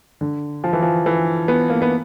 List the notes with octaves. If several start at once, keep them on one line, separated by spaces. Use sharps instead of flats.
D3
F3
E3
F3
E3
B3
A#3
B3